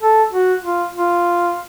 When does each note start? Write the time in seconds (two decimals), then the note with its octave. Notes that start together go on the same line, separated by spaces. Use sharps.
0.01 A4
0.32 F#4
0.64 F4
0.95 F4